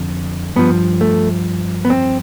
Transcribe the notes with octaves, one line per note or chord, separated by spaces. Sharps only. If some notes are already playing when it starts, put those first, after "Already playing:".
Already playing: F2 D3
G2 F3 B3
A3
B3
C4